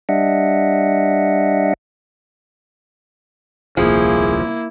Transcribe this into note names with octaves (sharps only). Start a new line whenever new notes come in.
G3 D4 D#5 E5 F#5
D#1 C2 F3 A#3 E4 G#4